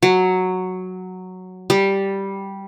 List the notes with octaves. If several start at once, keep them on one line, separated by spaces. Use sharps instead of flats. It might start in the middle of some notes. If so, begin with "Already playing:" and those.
F#3
G3